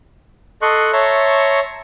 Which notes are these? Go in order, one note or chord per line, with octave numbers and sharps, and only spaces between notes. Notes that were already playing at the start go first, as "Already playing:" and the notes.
A4 D#5 C6 C#6 F#6
C#5 E5 A5 A#5 C6 C#6